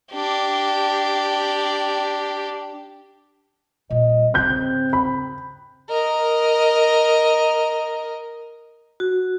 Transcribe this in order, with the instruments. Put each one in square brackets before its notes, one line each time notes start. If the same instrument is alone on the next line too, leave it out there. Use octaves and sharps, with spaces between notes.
[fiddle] D4 G4
[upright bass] A#2 G3 [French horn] D#5
[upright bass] G#2 C#3 [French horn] C4 [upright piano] F#6 G6
[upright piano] B5
[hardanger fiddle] A#4 D#5
[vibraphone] F#4